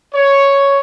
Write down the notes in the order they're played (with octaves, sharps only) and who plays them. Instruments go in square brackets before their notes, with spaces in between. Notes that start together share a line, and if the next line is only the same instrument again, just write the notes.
[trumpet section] C#5